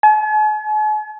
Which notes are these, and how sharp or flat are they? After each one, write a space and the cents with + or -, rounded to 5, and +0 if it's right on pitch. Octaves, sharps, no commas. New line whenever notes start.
G#5 +45